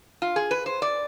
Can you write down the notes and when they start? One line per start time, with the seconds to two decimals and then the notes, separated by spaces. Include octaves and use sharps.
0.22 F4
0.36 G#4
0.51 B4
0.66 C5
0.82 D5